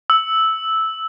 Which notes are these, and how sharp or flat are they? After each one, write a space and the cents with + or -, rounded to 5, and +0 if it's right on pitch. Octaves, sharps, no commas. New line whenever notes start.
E6 -10